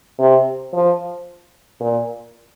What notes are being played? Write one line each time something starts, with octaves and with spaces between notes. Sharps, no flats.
C3
F3
A#2